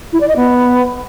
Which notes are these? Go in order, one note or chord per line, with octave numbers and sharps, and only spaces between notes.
E4
D5
D#5
B3